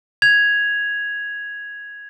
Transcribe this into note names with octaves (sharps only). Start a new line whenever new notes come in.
G#6 F7